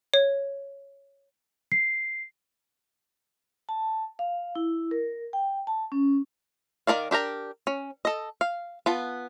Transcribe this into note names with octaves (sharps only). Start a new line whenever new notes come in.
C#5
C7
A5
F5
E4
A#4
G5
A5
C#4
D#3 E4 A#4 D5 F5
D4 G4 A#4 A#5
C#4
A4 D#5
F5
B3 F4 A5